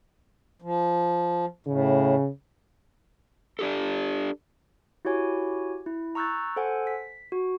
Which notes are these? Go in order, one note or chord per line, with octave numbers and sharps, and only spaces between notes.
F3
A2 C#3
D4 G4 A4
E4 F#4 G4 C#5 G#5
E4
A#5 C#6 E6 F#6 G6 A6
A4 C5 F#5 G#5
B6
F#4